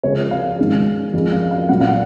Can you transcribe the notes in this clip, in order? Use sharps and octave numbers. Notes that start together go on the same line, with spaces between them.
C#2 C#3 F3 G#3 C#5
F5
G#2 D#3 G#3
F2 F3 G#3
F5
F5
A#2 F#3 F#5
F5
F#5